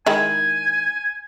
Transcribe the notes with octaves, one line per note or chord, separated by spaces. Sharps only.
D#3 G#3 E4 G#5